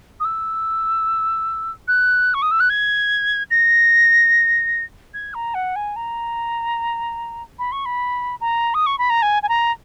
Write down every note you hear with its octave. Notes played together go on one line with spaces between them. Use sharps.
D#6
E6
F#6
C#6
D#6
E6
F#6
G#6
A#6
G#6
A#5
F#5
G#5
A#5
B5
C#6
B5
A#5
D#6
C#6
B5
A#5
G#5
G#5
A#5